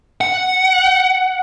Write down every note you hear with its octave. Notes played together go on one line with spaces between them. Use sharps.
F#5